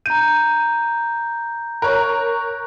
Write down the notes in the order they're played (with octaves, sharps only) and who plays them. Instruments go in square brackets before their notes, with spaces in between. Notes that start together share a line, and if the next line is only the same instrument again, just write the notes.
[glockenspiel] A#5 G6 [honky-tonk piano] D#7
[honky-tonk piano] A#4 C#5 [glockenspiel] F#6